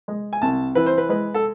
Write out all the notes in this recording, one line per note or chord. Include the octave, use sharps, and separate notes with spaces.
G#3
G#5
C2 A5
E3 B4
C5
B4
G#3 B4
A4